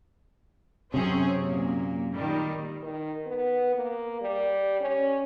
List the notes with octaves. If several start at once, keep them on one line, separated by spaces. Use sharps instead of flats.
F#2 C3 C4 C#4 G#4
A#2 A#3
A#2 D#3 G3
D#3
B3
A#3
G3
C#4